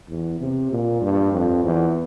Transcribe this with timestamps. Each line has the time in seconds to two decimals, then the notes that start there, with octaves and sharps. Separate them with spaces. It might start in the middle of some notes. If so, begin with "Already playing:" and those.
0.09 E2
0.40 C3
0.71 A#2
1.01 G2
1.32 F2
1.64 E2